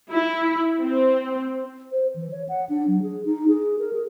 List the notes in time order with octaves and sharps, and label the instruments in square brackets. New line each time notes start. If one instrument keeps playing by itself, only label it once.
[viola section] E4
C4
[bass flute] C5
E3
C#5
F#5
D4
F#3
G#4
D#4
G#4
A#4
G#4